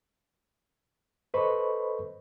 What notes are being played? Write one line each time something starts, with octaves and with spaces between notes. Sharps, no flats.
A4 B4 C5 D#5 B5 C#6